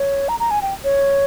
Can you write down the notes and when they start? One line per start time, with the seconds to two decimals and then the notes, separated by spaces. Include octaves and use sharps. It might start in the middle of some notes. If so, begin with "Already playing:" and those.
Already playing: C#5
0.29 A#5
0.40 A#5
0.51 G#5
0.62 G5
0.84 C#5